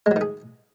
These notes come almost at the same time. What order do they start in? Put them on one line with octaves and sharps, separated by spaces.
G#3 F#3 D#3 G#4